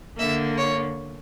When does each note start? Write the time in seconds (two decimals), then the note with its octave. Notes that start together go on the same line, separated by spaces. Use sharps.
0.18 D3 A#3 E5
0.58 C#5